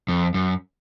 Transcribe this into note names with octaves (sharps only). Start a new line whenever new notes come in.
F2
F#2